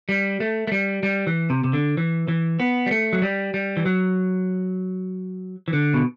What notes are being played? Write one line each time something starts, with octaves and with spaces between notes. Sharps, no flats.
G3
A3
A3
G3
G3
E3
C3
C3
D3
E3
E3
B3
G3
A3
F#3
G3
G3
E3
F#3
E3
D3
B2